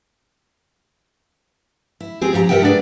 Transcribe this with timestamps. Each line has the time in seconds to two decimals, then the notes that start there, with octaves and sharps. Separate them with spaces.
2.00 E4
2.21 C4 G4 G#4
2.33 F3 G4 F5 A#5
2.49 G3 A#4 B4 E5 F#5 G5
2.62 D4 G#4 B4 D5